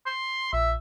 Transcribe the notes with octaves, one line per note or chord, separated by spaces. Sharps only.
C6
A#1 E5